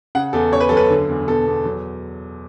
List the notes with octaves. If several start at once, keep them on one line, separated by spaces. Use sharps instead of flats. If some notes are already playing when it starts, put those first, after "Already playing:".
C#3 F#5
E2 A4
C#3 C#5
B4
F#2 A4
B4
D3
E2
B2 A4
E2
F#3